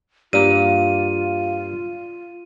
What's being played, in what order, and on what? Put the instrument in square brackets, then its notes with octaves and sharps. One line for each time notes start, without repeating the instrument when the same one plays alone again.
[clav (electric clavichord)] G2 A#3 [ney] F4 [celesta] G4 D5 F5 [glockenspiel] D#7